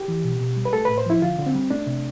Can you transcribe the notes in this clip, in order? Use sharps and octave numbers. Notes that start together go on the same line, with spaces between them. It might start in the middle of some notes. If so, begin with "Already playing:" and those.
Already playing: G4
E3
B2
B2
G3
B4
A3 A4
A2 B4
C5
F3 E4
D3 F4
D3
C4
G3
A3 D4
C3